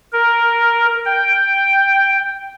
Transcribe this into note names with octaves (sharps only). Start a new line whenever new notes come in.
A#4
G5